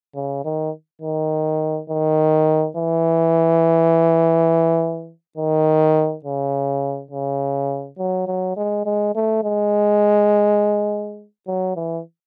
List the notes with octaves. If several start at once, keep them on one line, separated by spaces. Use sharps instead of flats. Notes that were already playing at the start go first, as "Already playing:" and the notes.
C#3
D#3
D#3
D#3
E3
D#3
C#3
C#3
F#3
F#3
G#3
G#3
A3
G#3
F#3
E3